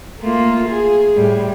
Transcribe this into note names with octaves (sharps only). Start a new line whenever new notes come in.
A3 A#3 F4
G#4
A2 G3